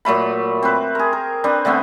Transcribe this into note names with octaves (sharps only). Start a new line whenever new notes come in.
A#2 F#3 A3 B5
C4 B4
G#4 A#4
A#4
C4 D4 B4
D3 A3 B3 C4